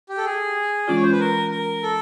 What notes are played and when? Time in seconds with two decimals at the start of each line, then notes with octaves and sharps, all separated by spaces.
0.09 G4
0.17 A4
0.25 G#4
0.88 E3 G#3 C#4 F4 D5
0.96 C#5
1.03 C5
1.12 B4
1.20 A#4
1.51 A#4
1.83 A4